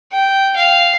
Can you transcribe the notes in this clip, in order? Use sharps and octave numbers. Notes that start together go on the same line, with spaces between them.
G5
F5